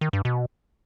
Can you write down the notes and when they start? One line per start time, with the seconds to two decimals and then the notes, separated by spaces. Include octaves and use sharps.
0.01 D#3
0.13 G2
0.25 B2